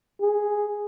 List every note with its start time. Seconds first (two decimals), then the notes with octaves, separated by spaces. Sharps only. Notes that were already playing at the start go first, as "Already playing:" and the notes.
0.21 G#4